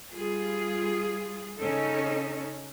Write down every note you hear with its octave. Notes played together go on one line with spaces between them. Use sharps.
G3 F4 G#4
C#3 C#4 D#4 A4